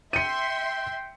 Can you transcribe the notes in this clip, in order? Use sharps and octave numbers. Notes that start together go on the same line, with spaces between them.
E5 G5 C6 C#7 D#7